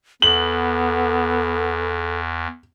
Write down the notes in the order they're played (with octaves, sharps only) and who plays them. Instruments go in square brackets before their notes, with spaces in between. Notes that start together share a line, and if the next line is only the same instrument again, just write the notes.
[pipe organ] E2 [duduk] B3 [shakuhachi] A4 [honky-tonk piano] F#7